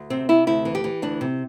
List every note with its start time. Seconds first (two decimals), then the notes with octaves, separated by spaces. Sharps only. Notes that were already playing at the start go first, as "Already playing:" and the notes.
Already playing: D2
0.10 C3 C4
0.29 C3 E4
0.47 D2 E4
0.65 E3
0.75 G4
0.84 E3
1.02 D2 D4
1.21 C3